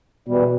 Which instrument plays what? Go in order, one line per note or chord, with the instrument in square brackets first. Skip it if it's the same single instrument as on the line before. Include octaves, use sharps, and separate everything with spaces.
[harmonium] E2 E3 G3 [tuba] B2